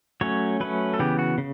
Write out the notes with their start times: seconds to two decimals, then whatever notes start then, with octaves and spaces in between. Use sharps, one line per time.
0.21 F#3 A3 C#4 C#5
0.60 F#3 A3 C#4 B4
0.94 A4
0.99 C#3 E3 B3 G4
1.19 F#4
1.38 C#3